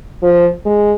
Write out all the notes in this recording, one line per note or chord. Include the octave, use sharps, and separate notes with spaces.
F3
G#3